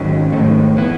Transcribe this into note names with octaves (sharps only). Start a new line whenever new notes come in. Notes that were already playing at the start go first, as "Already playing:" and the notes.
Already playing: G#2 D#3 F#3 C#4
G#2 D#3 A3
E3 B3 E4